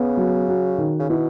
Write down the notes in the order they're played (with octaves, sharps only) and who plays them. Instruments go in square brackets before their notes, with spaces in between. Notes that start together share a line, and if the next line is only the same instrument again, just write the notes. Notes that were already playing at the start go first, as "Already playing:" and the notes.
Already playing: [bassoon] C#3 [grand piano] B3
[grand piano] F#3
F#4
D#3
[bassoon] C#3
[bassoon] B2 [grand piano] E4